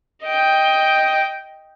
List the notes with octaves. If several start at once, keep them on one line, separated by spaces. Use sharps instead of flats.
D#5 G5